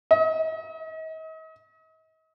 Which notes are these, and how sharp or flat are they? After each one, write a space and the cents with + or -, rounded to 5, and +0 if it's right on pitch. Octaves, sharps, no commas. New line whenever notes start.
D#5 +40